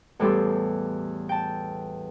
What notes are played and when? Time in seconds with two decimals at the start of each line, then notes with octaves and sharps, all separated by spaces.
0.19 E2 A2 G3 G4 A4 C6
1.29 G5 A5